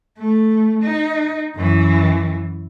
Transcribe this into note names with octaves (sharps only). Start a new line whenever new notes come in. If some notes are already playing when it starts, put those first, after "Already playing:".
A3
D#4
F#2 E3